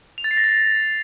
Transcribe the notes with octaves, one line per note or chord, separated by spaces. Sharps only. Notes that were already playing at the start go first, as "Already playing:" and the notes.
F7
A6
C7
A#6
A6